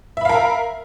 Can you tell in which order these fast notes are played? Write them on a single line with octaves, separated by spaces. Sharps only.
E5 B5 F5 A#4